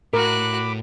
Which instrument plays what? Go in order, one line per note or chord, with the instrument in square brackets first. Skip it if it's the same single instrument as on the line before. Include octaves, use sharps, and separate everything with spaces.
[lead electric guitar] A2 [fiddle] F#4 F#6 [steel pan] A#4 [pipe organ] B5 D6